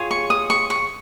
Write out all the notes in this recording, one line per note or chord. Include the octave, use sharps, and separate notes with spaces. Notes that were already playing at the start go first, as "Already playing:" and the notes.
Already playing: F4 G#4 C#5
C#6
D#6
C#6
C#6